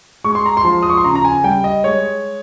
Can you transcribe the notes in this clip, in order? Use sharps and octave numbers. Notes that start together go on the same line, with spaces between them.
G#3 C#6
C6
A#5
C6
F3
D#6
C#6
C6
C#3 A#5
A#5
G#5
G3 G5
D#5
G#3 C#5